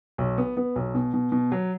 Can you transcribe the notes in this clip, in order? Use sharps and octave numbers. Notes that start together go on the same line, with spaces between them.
B1
B3
B3
B1
B2
B2
B2
F#3